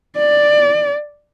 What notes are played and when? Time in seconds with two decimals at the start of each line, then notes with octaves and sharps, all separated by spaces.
0.17 D5